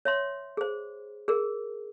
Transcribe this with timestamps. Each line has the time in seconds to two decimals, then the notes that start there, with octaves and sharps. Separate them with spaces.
0.05 C#5 E5 C6
0.57 G#4 C5
1.28 G#4 A#4